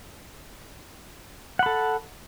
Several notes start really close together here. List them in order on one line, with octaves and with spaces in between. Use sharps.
F#5 B5 A4